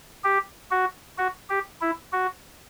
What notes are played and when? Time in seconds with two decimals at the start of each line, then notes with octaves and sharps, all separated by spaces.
0.24 G4
0.71 F#4
1.18 F#4
1.50 G4
1.81 E4
2.12 F#4